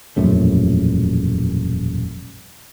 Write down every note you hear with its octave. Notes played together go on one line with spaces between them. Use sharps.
E1 A#1 F#2 A3